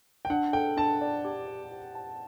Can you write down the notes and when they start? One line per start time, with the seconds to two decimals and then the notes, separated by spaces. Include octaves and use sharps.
0.25 G5
0.30 D4 F#5
0.53 A4 G5
0.77 D4 A5
1.01 D5
1.25 G4
1.48 D5
1.72 G4
1.95 A5